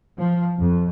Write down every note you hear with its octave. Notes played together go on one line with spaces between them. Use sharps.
F3
F2